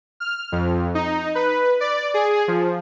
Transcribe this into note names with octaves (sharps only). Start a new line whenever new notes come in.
F6
F2
D#4
B4
D5
G#4
F3